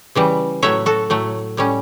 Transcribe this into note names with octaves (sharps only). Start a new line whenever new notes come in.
C#3 E3 G3
A2 F#3 A3 C#5 E5
F#4 A4
A2 F#3 A3
A2 G3 C#4